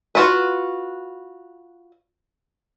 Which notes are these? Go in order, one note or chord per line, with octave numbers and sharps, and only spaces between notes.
F4 F#4 B4